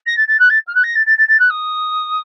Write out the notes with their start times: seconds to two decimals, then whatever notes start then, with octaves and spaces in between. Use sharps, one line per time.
0.06 A#6
0.17 A6
0.27 A6
0.39 F#6
0.49 A6
0.67 F6
0.75 F#6
0.83 A#6
0.95 A6
1.06 A6
1.17 A6
1.28 A6
1.39 F#6
1.50 D#6